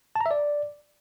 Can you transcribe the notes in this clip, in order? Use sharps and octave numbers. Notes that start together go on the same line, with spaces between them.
A5
A#5
E5
D5